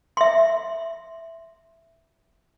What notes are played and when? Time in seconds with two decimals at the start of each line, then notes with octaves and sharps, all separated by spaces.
0.17 E5 C6